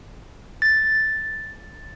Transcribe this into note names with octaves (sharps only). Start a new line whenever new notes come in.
A6